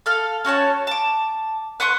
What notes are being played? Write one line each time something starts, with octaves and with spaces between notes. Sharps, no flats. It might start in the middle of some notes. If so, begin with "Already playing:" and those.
A4 F5 F6
C#4 F#4 C#5 A5
A5 D6
B4 F#5 C6 C#6